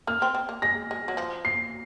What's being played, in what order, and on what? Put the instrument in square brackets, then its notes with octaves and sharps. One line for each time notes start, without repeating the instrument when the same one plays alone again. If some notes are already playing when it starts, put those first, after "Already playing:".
[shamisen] A#3 [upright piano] F6
[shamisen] C4
C4
A#3
[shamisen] G#3 [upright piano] A#6
[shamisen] G#3
F#3
F3
[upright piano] C7